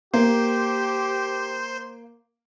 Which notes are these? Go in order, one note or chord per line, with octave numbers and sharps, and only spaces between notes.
A#3 G4 C5